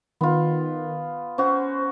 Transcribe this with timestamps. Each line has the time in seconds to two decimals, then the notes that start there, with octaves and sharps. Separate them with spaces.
0.21 D#3 B3 F4
1.38 C#4 F#4 C5